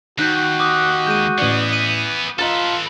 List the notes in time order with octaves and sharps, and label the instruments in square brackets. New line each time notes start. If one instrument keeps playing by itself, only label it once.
[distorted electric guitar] D#2 [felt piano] D#4 [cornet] F#4 [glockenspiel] F#6 G6
[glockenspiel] D6 D#6 F#6
[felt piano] G#3 [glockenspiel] G6 D#7
[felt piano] A1 D5 [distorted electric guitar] E3 B3
[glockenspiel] D#7
[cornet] F4 [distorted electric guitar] A4 B4 [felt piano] D#5 A#5 A6